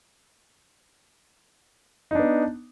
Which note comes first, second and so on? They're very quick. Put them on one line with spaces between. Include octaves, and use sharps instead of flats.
D#4 D4 B3